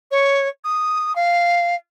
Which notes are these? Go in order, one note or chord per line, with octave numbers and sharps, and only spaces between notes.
C#5
D#6
F5